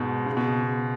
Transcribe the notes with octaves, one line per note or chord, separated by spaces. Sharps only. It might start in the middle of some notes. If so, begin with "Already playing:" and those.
Already playing: G#2 B2
C#3
B2